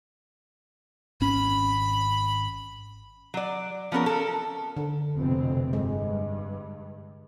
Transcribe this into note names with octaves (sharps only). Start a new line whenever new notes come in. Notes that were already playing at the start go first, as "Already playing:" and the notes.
G#1 C#4 B5
F#3 D5
F3 B3 C#4 A#4
A4 A#4
D3
F1 B2 C4
G2 G#3